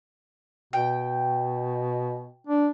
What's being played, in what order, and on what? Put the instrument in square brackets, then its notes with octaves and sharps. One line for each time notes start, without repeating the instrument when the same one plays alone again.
[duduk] B2 [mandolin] G5
[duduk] D4